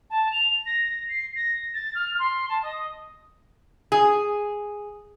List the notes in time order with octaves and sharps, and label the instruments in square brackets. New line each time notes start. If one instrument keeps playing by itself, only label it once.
[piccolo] A5
F7
A#6
C7
A#6
A6
F6
C6
A5
D#5
[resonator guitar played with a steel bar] G#4